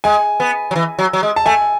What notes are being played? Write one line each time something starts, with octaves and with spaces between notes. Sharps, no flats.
G#3 G#5
B3
F#3
E3
F#3
F#3
G#3
A5
A3 G#5